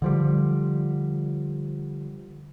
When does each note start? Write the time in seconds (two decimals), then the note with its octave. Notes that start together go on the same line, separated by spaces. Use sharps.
0.02 D3 F3 G3